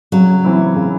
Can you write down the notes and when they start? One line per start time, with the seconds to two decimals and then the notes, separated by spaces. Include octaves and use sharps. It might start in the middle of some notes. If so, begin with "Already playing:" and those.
0.12 C#3 F#3
0.44 E3 C4 E4
0.76 C#3